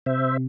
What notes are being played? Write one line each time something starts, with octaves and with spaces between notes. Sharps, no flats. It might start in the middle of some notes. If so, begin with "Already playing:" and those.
C3 C5 E5